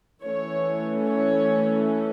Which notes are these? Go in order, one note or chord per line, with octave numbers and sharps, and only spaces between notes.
E3 A3 C#4 C#5
C#5